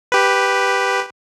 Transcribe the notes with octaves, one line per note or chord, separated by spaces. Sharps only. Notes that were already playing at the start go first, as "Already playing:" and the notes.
G4 B4